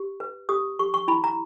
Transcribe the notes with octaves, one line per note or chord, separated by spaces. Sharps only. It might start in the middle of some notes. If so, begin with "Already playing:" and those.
Already playing: G4
B4
G4 D#6
G4 C#6
C#6
E4 B5
A#5